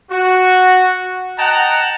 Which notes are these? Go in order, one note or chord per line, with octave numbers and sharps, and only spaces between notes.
F#4
D#5 F#5 G5 A5 A#5